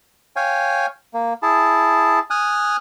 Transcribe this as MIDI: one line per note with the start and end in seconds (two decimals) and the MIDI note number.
0.36 0.86 73
0.36 0.86 77
0.36 0.86 79
0.36 0.86 80
1.14 1.33 58
1.43 2.19 64
1.43 2.19 68
1.43 2.19 81
2.30 2.77 80
2.30 2.77 87
2.30 2.77 89
2.30 2.77 90